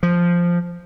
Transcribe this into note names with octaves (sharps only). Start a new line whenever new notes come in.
F3